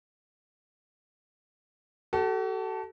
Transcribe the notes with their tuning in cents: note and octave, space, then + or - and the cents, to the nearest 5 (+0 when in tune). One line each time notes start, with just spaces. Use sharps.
F#4 +45 A4 +0